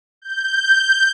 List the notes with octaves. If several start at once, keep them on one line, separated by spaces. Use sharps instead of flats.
G6